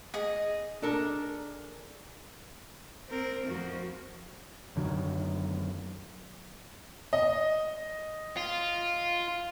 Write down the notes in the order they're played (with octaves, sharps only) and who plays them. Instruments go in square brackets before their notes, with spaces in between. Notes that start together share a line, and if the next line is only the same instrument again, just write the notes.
[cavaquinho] G#4 D#5
[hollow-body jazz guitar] D4 A4 A#4
[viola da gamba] C4 A#4
F2 F3 F#4
[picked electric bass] F#2 D3 D#3 F#3
[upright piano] D#5
[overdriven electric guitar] F4